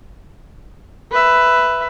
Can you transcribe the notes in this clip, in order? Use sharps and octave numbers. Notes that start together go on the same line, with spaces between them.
B4 E5